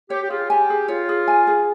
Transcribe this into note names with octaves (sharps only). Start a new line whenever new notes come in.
G4 C#5
G4
F4 G#4
G4 G#5
G#4
F4 C#5
G#4
G#5
G#4